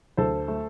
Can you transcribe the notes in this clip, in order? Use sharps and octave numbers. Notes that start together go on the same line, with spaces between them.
D2 A4 C5
A3